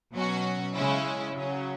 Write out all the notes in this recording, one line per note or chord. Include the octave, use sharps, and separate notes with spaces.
B2 F#3 C#4 F#4
C#3 G#3 C#4 E4
C#3 F#3 C#4